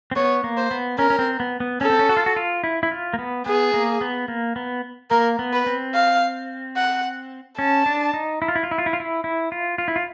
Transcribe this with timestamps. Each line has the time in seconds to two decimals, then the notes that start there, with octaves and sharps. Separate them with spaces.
0.11 C4
0.16 B3 C#5
0.44 A#3
0.57 C5
0.71 B3
0.98 C#4 A#4
1.10 C#4
1.19 C4
1.40 B3
1.60 B3
1.81 C#4 A4
1.90 C4
1.99 C#4
2.09 F#4
2.17 F4
2.26 F#4
2.36 F4
2.64 E4
2.83 E4
2.91 F4
3.14 A#3
3.19 B3
3.46 B3 G#4
3.74 A#3
4.01 B3
4.28 A#3
4.56 B3
5.11 A#3 A#4
5.39 B3
5.53 B4
5.66 C4
5.94 F5
6.77 F#5
7.58 C#4 A5
7.86 D4
8.14 D#4
8.42 E4
8.48 F4
8.56 E4
8.63 F4
8.71 E4
8.78 F4
8.86 E4
8.93 F4
9.00 E4
9.24 E4
9.52 F4
9.78 F4
9.88 E4
9.96 F4